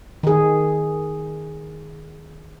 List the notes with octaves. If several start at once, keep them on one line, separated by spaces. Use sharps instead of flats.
D#3 G#4